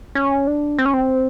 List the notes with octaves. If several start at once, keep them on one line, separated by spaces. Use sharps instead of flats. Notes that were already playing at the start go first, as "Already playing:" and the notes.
C#4
D4
C4
C#4
C4